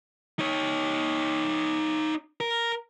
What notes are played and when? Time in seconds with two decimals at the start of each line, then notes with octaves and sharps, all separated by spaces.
0.39 D#4 C#5
2.41 A#4